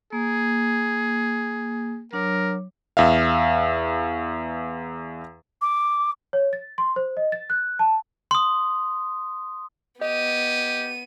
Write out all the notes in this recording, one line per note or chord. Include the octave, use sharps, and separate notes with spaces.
A#3 G#4
F#3 D4 A#4 C#5
E2 E5 F5
D6
C#5
A6
C6
C5
D#5
A6
F#6
A5
C6 D#6
B3 G4 D#5 D#7